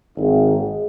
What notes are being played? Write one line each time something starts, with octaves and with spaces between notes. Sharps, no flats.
G#1
G#3